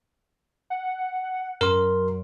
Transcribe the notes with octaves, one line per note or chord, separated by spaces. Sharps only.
F#5
F#2 A#4 C6